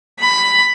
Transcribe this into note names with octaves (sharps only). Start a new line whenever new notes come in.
B5